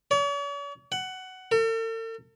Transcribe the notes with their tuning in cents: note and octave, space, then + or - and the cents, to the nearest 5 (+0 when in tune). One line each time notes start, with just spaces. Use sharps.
C#5 +45
F#5 +15
A4 +45